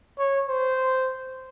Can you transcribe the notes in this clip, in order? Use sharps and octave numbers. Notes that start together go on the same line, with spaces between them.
C#5
C5